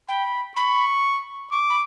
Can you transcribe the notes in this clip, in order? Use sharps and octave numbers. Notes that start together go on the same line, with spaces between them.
G5 B5
B5 C#6
C#6 D6
B5